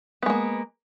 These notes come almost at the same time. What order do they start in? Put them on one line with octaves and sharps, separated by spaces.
B3 G#3 A#3